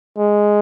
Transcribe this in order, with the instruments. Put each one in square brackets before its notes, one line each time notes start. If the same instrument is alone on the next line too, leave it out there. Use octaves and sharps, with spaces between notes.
[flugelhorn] G#3